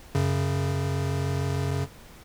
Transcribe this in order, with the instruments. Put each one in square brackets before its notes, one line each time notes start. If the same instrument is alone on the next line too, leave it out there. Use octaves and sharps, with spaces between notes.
[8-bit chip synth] F#2 C#3